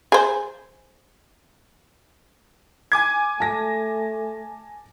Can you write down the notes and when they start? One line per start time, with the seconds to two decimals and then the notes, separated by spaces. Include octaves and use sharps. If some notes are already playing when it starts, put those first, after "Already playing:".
0.12 G#4 C5
2.92 G#5 D6 G#6
3.40 A3 A5 A#6